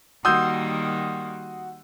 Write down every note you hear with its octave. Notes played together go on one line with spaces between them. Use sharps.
D#3 G3 A#3 F#4 C6 D#6 E6 G6